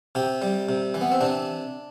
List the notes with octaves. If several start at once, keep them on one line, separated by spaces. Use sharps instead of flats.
C3 G4
G3
C3
E3
B3
C4
C3 D4